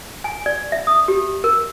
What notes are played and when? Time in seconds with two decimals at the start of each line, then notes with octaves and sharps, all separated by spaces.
0.24 G#5
0.46 D5
0.72 E5
0.87 D#6
1.08 G4
1.44 A#4